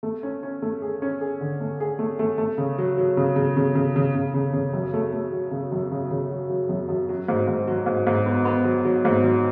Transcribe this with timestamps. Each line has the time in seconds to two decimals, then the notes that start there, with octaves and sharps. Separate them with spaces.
0.03 A3
0.23 C#4
0.43 C#4
0.62 A3
0.82 G#4
1.02 C#4
1.21 G#4
1.41 D3
1.60 A3
1.80 G#4
1.99 A3
2.19 A3
2.38 A3
2.58 C#3
2.78 F#3
2.98 F#3
3.17 C#3
3.36 C#3
3.57 C#3
3.75 C#3
3.96 C#3
4.15 C#3
4.34 C#3
4.53 C#3
4.73 F#2
4.94 A3
5.13 A3
5.32 F#3
5.51 C#3
5.72 F#2
5.92 C#3
6.11 C#3
6.31 F#3
6.49 F#3
6.69 F#2
6.89 F#2
7.09 F#3
7.28 G#2
7.47 G#2
7.67 F#3
7.86 G#2
8.07 G#2
8.26 B3
8.45 B3
8.65 F#3
8.85 F#3
9.05 G#2
9.24 F#3